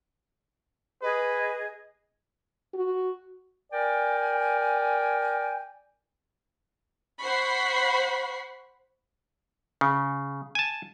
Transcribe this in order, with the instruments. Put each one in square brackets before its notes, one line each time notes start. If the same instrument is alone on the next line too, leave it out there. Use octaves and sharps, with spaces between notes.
[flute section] G#4 D#5 [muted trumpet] B4
[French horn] F#4
[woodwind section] A#4 D5 G5 G#5
[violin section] C5 F#5 B5 C#6 C7
[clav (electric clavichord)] C#3
G#5 A5